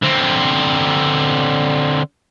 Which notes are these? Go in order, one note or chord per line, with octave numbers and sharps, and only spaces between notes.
D3 C4